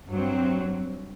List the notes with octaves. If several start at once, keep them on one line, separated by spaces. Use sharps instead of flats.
G2 F#3 C4